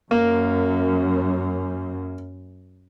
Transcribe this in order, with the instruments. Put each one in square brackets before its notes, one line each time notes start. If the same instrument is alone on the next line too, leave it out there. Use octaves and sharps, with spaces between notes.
[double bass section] F#2 [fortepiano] A#3